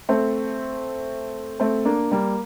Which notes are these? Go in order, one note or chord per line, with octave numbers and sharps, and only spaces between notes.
A3 C4
A3 C4
A#3 D4
G3 A#3